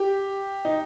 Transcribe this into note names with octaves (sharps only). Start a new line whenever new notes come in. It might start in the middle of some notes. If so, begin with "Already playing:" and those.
Already playing: G4
D#4